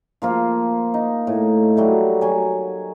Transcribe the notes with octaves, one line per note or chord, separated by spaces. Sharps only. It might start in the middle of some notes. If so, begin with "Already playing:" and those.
F3 A#3 F4
D#4
A2
F#3 G3 A3
F#3 G#5